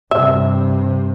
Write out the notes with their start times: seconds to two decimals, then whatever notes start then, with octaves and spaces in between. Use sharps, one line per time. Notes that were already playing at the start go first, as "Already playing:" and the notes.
0.11 G2 C3 E5